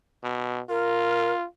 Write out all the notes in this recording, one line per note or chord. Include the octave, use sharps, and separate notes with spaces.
B2
F4 A#4